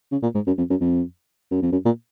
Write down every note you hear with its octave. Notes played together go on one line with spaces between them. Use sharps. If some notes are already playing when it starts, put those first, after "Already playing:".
C#3
A#2
G#2
F#2
F2
F#2
F2
F#2
F2
F#2
A#2